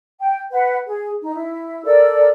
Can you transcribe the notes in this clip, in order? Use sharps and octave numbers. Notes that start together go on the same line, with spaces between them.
G5
B4 F#5
G#4
D#4
E4
A4 A#4 D5 E6